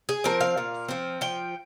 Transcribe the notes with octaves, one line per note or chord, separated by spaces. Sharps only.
G#4
F3 C4 A#4
F5
A#2
F3 C4
F3 G5